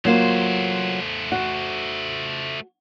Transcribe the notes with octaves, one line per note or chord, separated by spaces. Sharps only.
F#3 A3 A#3 F4 C5
F#4